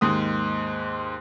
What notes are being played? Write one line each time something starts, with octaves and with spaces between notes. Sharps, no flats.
D#2 G#2 D#6